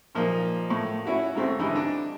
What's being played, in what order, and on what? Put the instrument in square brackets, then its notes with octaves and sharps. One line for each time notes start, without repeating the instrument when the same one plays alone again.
[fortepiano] A#2 F3 A#3 D#4
A2
C#4 E4 F#4
G#2 C#3 A3 C4
D3 E3 G3 D#4 E4
D4